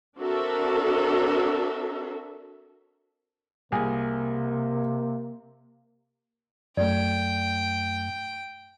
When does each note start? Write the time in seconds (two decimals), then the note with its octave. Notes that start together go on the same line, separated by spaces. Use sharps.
0.19 C4 D4 F#4 A4 A#4 E5
3.72 C2 C3 A#3 G#4 G#5
6.77 F#2 A3 D5 G5